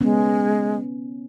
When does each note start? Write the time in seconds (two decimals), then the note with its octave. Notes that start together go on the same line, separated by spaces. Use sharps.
0.01 G#3 B3 C#4